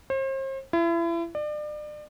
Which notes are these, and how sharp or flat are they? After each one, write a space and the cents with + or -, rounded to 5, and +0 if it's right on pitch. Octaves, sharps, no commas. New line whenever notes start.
C5 +40
E4 +35
D5 +35